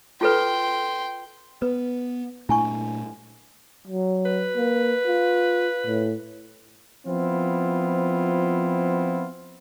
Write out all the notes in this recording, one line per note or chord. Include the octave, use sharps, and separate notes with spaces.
F4 A4 B4 G5 C6
B3 B4
A#2 A3 D4 E4 G#5 C#6
F#3
B4
A#3
F4
A2
F3 B3 C4 E4 F4